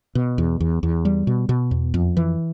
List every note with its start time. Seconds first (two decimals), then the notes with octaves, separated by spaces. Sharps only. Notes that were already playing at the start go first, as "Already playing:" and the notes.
0.15 B2
0.38 E2
0.60 E2
0.83 E2
1.05 G3
1.27 B2
1.49 B2
1.71 E2
1.94 F2
2.17 E3